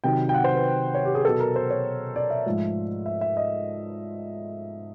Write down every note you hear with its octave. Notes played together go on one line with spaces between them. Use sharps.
C3 D#3 F#3 G5
G5
F#5
C5
B4
C#5
G4
G#4
B2 F#3 B3 A4
A#4
C5
C#5
D5
E5
G#2 F3 A3
E5
E5
D#5